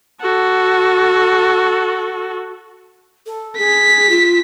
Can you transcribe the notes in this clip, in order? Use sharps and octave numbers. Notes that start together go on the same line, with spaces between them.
F#4 A4
A4
G#4 B6
F4